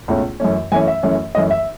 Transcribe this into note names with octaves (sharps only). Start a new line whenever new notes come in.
C#2 B2 A3 C#4
F#2 E3 A3 C#4
F#2 E3 A3 C#4 G#5
E5
F#2 E3 A3 C#4
F#2 E3 A3 C#4 D#5
E5